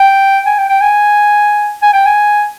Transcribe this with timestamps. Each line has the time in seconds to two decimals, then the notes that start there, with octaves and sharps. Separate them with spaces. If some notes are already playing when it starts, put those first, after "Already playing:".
Already playing: G5
0.46 G#5
0.58 G5
0.69 G5
0.81 G#5
1.82 G#5
1.93 G5
2.05 G#5